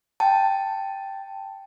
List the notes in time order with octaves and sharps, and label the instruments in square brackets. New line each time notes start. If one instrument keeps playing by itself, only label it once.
[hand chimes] G5 A5